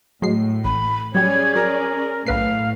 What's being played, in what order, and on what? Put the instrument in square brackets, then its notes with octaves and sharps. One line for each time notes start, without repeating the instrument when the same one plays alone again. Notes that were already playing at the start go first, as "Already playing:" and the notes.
[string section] A2 [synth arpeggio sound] F#3 G#3 C7
[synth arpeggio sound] A1 [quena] B5
[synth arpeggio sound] F#3 G3 [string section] C#4 G#4 D5 [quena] G#6
[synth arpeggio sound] F#3 [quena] A#4
[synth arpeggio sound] B1 B4 C7 [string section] A2 [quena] F5